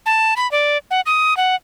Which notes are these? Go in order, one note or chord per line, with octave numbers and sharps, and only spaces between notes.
A5
B5
D5
F#5
D#6
F#5